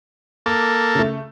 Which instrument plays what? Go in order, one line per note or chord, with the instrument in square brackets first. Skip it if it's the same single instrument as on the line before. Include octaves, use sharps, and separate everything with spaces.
[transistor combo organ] A#3 A4 [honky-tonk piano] D6
[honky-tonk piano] C#3 A3